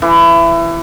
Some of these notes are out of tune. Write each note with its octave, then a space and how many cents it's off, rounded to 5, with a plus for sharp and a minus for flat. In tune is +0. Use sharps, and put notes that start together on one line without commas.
E3 +25